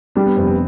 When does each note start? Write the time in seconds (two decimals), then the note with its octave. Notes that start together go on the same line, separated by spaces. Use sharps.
0.16 G3 D4
0.26 B3
0.37 F1 C4
0.47 C4